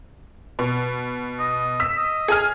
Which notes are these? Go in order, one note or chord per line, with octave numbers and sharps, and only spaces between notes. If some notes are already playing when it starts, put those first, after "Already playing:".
B2
D#5
E6 B6
D#5
G#4 G#5 F6